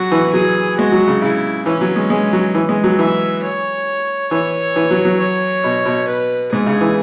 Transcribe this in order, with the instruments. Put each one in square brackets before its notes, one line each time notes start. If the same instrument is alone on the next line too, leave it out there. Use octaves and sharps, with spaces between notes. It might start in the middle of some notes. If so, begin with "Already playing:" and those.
Already playing: [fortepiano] F#3 [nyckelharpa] F#4
[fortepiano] E3
[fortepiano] F#3 [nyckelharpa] G#4
[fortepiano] G#3 [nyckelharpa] F#4
[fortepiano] F#3
C#3
[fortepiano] C#3 [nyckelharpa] E4
[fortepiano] E3 [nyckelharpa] C#4
[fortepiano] F#3
G#3
G#3
F#3
E3
G#3
F#3
[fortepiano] E3 [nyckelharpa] E5
[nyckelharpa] C#5
[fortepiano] E3 [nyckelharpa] C#5
[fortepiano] E3
F#3
F#3
[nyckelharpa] C#5
[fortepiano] B2
B2
[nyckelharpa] B4
[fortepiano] G#2 [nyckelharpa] G#4
[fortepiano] C#3
E3